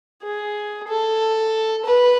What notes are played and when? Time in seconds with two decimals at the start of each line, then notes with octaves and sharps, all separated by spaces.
0.23 G#4
0.88 A4
1.85 B4